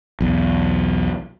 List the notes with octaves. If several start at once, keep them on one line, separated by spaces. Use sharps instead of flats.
B1 E2